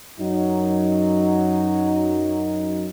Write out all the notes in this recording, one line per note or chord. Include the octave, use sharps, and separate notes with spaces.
F#2 F#3 D#4